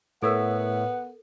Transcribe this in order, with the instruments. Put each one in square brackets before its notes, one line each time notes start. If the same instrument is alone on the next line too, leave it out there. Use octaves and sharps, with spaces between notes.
[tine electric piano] A2 C#5 E5 [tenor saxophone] B3 [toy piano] A4 A#4 [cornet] F#5